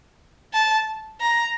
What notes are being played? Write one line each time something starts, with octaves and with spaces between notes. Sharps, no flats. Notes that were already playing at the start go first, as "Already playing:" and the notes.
A5
A#5